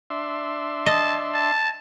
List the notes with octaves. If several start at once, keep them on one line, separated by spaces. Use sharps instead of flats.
D4 E5 C6
D#5 A5
A5